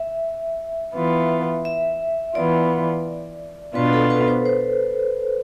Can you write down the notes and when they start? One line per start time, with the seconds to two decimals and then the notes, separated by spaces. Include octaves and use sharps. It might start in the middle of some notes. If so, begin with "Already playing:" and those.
Already playing: E5
0.95 E3 B3 F4
1.65 E5
2.35 E3 B3 F4 D5
3.75 B2 B3 D4 F4 B4
3.93 A4
4.10 B4
4.28 C5
4.45 C5